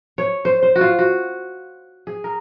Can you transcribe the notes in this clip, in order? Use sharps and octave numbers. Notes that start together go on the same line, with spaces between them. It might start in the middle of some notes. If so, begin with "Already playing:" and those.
C#5
C5
C5
F#4
F4
F#4
G#4
A#4